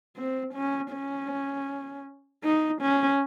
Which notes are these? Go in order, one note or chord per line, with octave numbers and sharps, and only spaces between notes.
C4
C#4
C#4
D#4
C#4